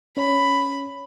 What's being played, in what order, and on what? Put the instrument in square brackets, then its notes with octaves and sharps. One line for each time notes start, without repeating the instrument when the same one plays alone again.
[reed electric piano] C#4 C#5 [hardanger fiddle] B5